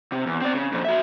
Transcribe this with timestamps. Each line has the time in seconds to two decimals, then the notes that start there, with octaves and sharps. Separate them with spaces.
0.12 C3
0.27 E2
0.42 C4 D5
0.54 C#3
0.72 F2 A#2
0.84 F#4 E5